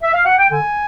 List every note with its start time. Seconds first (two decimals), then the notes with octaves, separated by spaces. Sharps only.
0.03 E5
0.14 F5
0.26 F#5
0.38 G5
0.50 D3 G#5